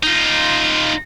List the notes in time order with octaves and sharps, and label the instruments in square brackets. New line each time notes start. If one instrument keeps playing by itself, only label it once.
[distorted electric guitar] D#4 F4